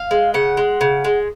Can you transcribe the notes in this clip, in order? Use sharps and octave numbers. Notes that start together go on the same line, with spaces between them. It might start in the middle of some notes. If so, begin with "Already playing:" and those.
Already playing: F5
G#3
C#3 F#5
G#3
C#3
G#3